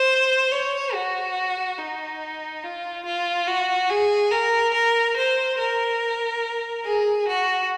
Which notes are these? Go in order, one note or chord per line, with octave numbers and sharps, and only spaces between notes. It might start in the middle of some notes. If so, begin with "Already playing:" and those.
Already playing: C5
C#5
F#4
D#4
F4
F4
F#4
G#4
A#4
A#4
C5
A#4
G#4
F#4